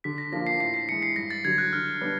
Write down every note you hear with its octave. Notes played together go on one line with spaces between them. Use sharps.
D3 B6
A#6
F3 A#3 D4 F4 A#6
C7
A2 C7
C7
E3 G#3 C#7
C7
G2 A#6
A6
D3 F#3 G#6
F#6
D3 F6
G3 B3 D4